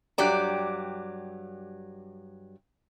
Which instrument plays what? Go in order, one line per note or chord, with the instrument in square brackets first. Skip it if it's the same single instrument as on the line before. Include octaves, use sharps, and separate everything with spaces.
[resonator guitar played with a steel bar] G2 F#3 G4 D5 A#5